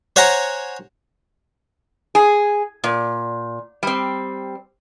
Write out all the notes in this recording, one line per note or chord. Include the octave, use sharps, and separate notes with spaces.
C5 C#5 F#5 G#5 A#5
G#4
A#2
G3 C4